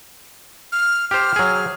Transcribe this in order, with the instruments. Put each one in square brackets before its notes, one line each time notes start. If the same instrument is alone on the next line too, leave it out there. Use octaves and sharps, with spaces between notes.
[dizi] F6
[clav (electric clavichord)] G4 C5 [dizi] F6
[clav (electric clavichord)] F#3 G#4